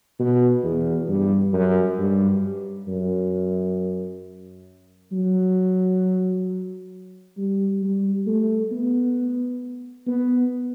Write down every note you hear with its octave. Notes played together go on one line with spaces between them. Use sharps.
B2
E2
G2
F#2
G2
F#2
F#3
G3
G3
A3
B3
B3